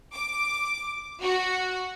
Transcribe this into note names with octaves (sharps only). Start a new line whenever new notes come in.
D6
F#4